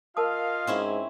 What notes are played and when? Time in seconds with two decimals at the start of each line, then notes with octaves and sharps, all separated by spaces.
0.17 F4 A#4 D#5 F5 A5 D#6
0.67 G#2 C4 C#4 E4